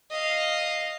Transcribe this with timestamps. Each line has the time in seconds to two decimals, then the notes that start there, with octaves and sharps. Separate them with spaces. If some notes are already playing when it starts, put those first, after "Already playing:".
0.11 D#5 F5